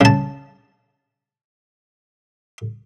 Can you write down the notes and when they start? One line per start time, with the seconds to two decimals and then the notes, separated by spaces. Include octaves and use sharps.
0.01 C#3 A5